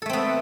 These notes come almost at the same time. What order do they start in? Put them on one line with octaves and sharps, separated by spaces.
A4 A3 C4 B3